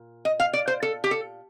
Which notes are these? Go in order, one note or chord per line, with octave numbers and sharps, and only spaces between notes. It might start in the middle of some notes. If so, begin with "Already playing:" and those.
Already playing: A#2
D#5
F5
D5
C5
A4
G4
A4